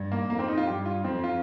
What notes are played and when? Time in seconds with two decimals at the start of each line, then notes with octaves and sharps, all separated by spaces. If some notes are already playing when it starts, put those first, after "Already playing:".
Already playing: G2
0.12 A#3
0.29 F2 A#3
0.39 C4
0.48 D#4
0.58 F4
0.67 G2 G4
0.86 F4
1.04 F2 C4
1.24 F4